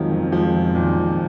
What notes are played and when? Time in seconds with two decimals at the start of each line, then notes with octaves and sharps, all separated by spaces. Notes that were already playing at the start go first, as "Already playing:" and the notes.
Already playing: F2 D#3 F3 F#3 G#3
0.12 F2
0.32 F3 G#3
0.54 F2
0.75 A#2 D#3
0.96 F2